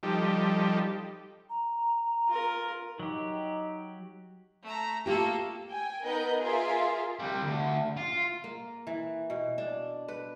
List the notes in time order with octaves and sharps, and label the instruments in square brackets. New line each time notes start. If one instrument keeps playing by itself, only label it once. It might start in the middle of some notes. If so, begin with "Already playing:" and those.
[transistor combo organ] F3 G3 D#4 G4 A4
[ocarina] A#5
[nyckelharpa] F4 A#4
[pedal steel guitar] F#3 G4 [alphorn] D#4
[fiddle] A3 A#5
[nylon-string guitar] A3 F4 G4 [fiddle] A#3 A4
[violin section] G5 G#5
B3 D#4 A#4 B4 D#5 G6
F4 G#4 A#4 E5 F5
[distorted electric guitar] C3 G3
D2
F4
[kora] A#3
E3
B2
D4
B4